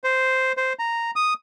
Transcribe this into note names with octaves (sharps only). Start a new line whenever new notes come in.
C5
C5
A#5
D#6